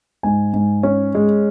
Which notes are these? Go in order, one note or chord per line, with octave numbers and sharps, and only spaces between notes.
G#2 G#5
G#2
C#4
G#3